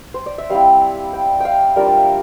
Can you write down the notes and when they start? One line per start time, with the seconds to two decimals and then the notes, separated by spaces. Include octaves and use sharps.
0.14 C5
0.26 D5
0.38 E5
0.50 G3 C4 E4 F5
1.13 G5
1.40 F5 G5
1.76 G3 D4 F4 A#4
1.87 D5
1.97 E5